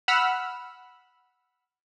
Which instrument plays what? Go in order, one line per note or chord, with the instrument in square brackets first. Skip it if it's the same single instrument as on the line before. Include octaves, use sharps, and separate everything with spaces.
[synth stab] F#5 B5 E6 F6